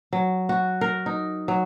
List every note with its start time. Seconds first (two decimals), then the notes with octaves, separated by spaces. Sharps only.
0.13 F#3
0.49 F#4
0.81 A#4
1.06 D#4
1.48 F#3